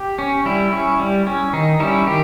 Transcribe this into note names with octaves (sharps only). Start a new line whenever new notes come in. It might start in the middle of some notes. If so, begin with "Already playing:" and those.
Already playing: G4
C#4
G3 E4
C#4
G3
C#4
D#3 D#4
G3 C#4 E4
D#3 G4